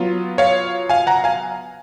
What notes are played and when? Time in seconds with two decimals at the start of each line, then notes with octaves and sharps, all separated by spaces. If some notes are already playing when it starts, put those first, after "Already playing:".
Already playing: F#3 B3 F4
0.38 C#5 F5
0.89 F5 G#5
1.07 F#5 A#5
1.24 F5 G#5